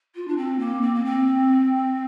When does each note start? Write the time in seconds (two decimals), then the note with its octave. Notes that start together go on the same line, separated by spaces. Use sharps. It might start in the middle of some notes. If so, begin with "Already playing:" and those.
0.15 F4
0.28 D4
0.37 C4
0.59 A#3
0.82 C4
0.94 A#3
1.04 C4